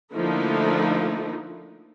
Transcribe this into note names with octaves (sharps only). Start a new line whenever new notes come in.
D3 F3 A3 A#3 D#4 E4